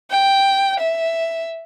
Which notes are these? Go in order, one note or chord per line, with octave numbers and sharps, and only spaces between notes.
G5
E5